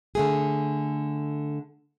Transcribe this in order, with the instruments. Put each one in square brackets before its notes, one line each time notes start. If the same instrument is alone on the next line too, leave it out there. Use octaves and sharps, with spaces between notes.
[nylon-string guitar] D3 A3 G#4